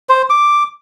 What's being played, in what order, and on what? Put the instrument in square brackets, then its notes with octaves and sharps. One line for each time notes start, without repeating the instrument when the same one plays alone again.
[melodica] C5
D6